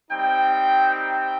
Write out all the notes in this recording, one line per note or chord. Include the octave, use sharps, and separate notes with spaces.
G3 C4 D#4 G5
G5